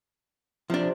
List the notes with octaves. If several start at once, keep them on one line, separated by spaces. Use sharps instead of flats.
C3 F3 D4 A4